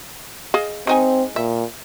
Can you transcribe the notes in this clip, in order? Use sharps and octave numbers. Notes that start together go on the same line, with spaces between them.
G#4 D#5 F5
G#3 C4 D#4 G#5
A#2 E5